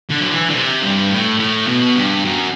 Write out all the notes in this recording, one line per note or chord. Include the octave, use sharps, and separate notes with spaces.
D3
F#3
E3
D3
C3
G2
A2
A2
B2
G2
F#2